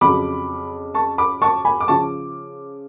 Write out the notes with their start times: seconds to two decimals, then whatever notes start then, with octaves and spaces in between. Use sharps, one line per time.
0.01 F2 C#3 F#3 B5 D6
0.95 A5 C#6
1.18 B5 D6
1.42 A5 C#6
1.65 G#5 B5
1.80 D6
1.88 C#3 F3 A5 C#6